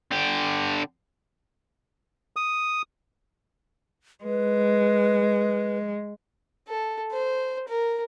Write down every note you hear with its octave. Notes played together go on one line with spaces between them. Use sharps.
D3 G4
D#6
G#3 B4
A4
C5
A#4